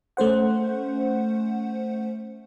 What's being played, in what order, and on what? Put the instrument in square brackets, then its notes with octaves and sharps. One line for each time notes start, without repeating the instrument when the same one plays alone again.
[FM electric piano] A3 C#4 C5 F#5